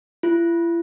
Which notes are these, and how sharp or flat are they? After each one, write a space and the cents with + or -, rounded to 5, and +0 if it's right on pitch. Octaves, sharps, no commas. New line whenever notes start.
E4 +40